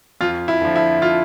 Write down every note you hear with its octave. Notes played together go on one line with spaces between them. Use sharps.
F2 F4
E4
D3 F3
E4
F4